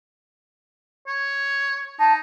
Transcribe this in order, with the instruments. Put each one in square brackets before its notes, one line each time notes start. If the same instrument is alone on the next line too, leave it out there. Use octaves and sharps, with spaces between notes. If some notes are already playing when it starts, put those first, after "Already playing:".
[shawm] C#5
[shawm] D#4 [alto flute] A5